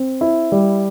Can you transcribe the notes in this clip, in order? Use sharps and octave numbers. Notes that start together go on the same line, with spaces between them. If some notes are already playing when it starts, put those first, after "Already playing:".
Already playing: C4
E4
G3